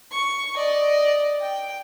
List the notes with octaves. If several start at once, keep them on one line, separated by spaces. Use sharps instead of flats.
C#6
D5 D#5
G5